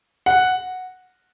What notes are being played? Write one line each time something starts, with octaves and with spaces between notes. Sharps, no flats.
F#5